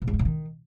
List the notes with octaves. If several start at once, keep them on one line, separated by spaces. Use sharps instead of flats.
B2
G#2
G2
C#3
D#3